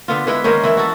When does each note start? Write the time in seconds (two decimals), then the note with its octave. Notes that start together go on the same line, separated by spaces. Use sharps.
0.08 D3 B3 F4
0.27 D3 G#3 E4 B4
0.44 D#3 G#3 A#3 C#4
0.63 E3 E4
0.77 F#4 A4